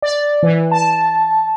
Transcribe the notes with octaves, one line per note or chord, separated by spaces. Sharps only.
D5
E3
A5